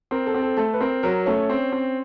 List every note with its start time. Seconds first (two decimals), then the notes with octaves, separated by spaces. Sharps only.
0.11 C4 A#4
0.27 A4
0.34 C4
0.42 A4
0.57 A3 A4
0.73 B4
0.80 C4 A#4
1.03 F#3 A#4
1.26 A3 C#4 C#5
1.49 C4
1.72 C4